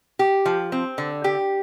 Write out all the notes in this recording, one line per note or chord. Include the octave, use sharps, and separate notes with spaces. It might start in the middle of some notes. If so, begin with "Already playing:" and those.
G4
F3
C4
D3
G4